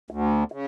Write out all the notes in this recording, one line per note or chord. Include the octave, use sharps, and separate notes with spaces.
D2
C#3